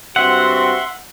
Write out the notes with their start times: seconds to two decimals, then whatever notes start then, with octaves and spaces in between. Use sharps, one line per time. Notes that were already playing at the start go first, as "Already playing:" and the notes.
0.16 G2 C4 F#4 E5 F#5 C6